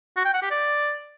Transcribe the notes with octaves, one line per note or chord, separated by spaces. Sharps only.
F#4
G5
F#5
G4
D5